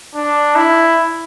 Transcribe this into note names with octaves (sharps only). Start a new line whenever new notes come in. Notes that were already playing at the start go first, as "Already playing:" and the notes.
D4
E4